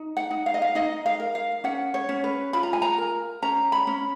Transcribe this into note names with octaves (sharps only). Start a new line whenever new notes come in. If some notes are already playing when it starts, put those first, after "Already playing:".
Already playing: D#4
F#5
D#4
F5
D#5
F5
D#4 D#5
F5
A#4
F5
C#4 F#5
C#5
C#4
B4
F4 B5
A#5
G#5
A#5
A#4
C#4 A#5
B5
C#4